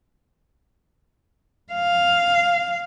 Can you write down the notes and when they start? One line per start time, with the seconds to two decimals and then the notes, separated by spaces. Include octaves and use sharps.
1.73 F5